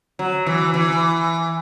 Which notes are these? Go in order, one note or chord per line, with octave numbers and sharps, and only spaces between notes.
F#3
E3
E3